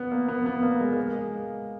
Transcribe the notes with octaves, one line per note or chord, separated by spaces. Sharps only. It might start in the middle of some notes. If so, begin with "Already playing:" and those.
Already playing: B3
A#3
B3
B3
A#3
G#3
A#3
G#3